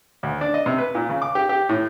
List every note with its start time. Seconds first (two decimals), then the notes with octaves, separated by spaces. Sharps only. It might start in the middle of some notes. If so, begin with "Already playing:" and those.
0.23 D2
0.41 D4
0.54 D#5
0.66 C3
0.78 B4
0.95 A#2
1.09 C#3
1.22 D6
1.35 G4
1.49 G4
1.69 A2